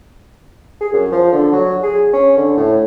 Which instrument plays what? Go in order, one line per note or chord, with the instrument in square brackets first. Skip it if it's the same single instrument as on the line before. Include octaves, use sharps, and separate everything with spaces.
[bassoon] G#4
F#2
F3
D3
F#3
G#4
C#4
D3
A2